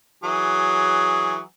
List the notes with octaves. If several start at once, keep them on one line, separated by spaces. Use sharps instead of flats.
E3 F#3 G#4